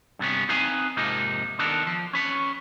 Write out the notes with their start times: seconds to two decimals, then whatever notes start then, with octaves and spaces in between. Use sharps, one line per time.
0.19 G2 C3 B3 C#4
0.49 C4 D#4 B4 F5 G#5
0.97 F2 G#2 C3 F3 A#3 D#4
1.59 D#3 B3 D4 A4 A#4
1.87 F3
2.13 C#4 B4 C#5